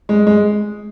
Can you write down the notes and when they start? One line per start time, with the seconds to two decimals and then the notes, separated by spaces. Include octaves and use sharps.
0.09 G#3
0.27 G#3